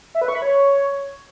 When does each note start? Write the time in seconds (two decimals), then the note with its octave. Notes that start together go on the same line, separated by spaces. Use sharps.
0.15 E5
0.21 B4
0.28 C#6
0.35 B5
0.42 C#5